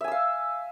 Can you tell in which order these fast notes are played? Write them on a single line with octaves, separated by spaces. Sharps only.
E5 G#5 E6 F5